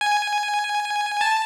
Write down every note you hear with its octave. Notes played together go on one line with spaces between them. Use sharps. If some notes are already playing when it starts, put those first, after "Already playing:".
G#5
A5